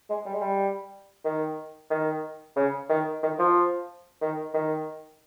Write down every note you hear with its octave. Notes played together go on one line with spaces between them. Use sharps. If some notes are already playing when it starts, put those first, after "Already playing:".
G#3
G3
G#3
G3
D#3
D#3
C#3
D#3
D#3
F3
D#3
D#3